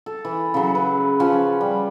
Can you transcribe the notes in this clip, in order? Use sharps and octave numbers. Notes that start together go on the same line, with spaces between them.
A4
E3
C#3 F#3
B4
F3 C#4 B4 G#5
G3